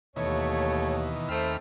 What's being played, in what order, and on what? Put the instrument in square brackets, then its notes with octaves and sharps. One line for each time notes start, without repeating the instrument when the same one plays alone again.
[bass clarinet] D#2 [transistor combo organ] B2 D#3 E3 [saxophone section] A3 C#5
[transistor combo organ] D#2 B5 F6 [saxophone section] A3 C4